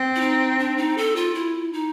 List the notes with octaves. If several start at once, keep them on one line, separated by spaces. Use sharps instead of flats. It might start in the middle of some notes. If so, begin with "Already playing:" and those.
Already playing: C4
E4
D#4
D4
D#4
A4
F4
E4
D#4